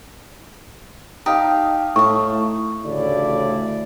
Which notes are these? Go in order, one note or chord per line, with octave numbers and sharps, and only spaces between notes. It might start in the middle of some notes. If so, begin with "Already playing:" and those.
D#4 G4 F5 A5
A2 E5 A5 C#6
A1 D2 A2 C#3 E4 D5